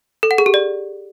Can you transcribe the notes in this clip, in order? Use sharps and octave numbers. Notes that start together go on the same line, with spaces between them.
A4
F#5
G#4
G4
D5